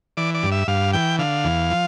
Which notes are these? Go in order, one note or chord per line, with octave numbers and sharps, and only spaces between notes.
E3 D5
D5
G2
E5
G2 F5
E3 G5
D3 F5
E2
F3